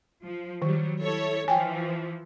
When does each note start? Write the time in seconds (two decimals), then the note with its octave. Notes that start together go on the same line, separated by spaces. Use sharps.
0.24 F3
0.62 D#3 F#3 G3
1.00 E4 A4 C#5
1.48 E3 F3 G5 G#5